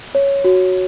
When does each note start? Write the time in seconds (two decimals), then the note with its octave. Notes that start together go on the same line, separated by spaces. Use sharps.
0.15 C#5
0.44 F#4